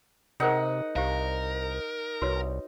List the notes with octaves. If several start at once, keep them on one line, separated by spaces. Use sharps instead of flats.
C3 D#4 G#4 A#4 C5 F#5
C2 G4 A#4 C5 F5
C2 F#4 B4 C#5